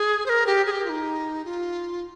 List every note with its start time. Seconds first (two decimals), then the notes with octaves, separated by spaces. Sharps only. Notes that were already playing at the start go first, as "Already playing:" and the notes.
Already playing: G#4
0.26 C5
0.29 A#4
0.46 G4
0.66 G#4
0.71 G4
0.85 F4
0.89 D#4
1.45 F4